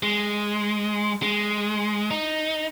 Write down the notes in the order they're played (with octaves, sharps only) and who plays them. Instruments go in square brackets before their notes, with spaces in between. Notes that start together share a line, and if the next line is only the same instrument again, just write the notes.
[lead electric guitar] G#3
G#3
D#4